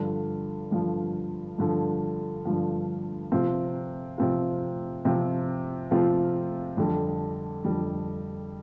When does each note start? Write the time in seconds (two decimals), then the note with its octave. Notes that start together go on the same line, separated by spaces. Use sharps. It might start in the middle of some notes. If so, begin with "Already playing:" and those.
Already playing: G2 D3 F3
0.71 G2 D3 F3
1.58 G2 D3 F3
2.45 G2 D3 F3
3.32 C3 F3 C4 F4
4.18 C3 F3 C4 F4
5.05 C3 F3 C4 F4
5.91 C3 F3 C4 F4
6.77 F2 D3 G3
7.64 F2 D3 G3